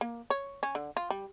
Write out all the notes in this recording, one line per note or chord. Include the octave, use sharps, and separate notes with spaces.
A#3
C#5
C#4
D3
F4
G3